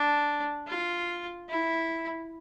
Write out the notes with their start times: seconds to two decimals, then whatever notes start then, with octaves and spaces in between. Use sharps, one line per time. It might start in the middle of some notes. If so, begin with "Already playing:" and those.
Already playing: D4
0.67 F4
1.49 E4